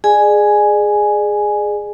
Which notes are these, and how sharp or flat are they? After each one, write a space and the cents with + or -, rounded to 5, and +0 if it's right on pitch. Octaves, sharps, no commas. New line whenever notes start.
G#4 +0 D5 +40 G#5 +0